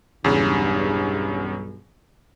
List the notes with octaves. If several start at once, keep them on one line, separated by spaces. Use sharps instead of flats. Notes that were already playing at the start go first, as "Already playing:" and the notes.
B1 E2 G2 C#3